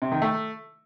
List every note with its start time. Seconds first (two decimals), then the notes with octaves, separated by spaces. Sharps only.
0.02 C3
0.12 D#3
0.22 A3